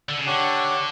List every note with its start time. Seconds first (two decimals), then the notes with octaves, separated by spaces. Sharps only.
0.09 D3
0.18 C#3
0.26 D3 D4 G4 C#5 F#5